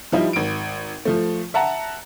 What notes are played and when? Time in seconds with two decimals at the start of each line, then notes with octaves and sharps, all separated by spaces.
0.12 F3 G3 D#4 E4 G4
0.33 G#1 D7
1.05 F3 A3
1.54 E5 F#5 A5 A#5